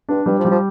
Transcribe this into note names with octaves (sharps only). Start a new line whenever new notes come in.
G2 D4
G2 G3
F3
G3
F3